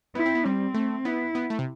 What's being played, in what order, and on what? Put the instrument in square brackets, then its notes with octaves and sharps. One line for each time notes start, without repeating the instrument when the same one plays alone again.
[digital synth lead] B3 [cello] E4
[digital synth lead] C4
B3
[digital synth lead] G3 [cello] C4
[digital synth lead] A3
[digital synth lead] B3 [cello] E4
[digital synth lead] B3
A3
C3